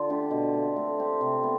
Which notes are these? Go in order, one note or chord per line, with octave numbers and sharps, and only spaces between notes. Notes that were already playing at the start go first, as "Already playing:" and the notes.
Already playing: D3 F4
A3 D4 G4
B2
A3 C4
A3
C4 G4
C3
B3